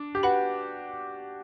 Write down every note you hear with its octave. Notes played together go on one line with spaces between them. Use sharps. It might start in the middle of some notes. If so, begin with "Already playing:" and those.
Already playing: D4
G4
F#4 B4 F#5 B5